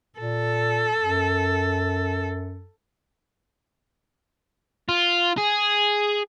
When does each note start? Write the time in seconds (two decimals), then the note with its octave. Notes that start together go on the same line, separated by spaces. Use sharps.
0.19 A#2 A4
1.00 F#2
4.89 F4
5.37 G#4